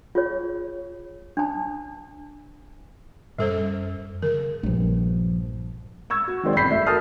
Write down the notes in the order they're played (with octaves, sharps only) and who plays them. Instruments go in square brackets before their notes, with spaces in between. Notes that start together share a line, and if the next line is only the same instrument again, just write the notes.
[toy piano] F4 G#4 C#5
D4 A5
[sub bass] F#2 [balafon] G3 A4 C5
[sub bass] C#3 [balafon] A#4
[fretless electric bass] A#1 G2 [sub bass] F3
[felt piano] C#6 E6 G#6
F#4
D#3 F#3 G#3 C4 C5 D5
G1 E3 B5 G6 B6 C7
A3 E5
F#4 A4 A#4 A5 D#6 F6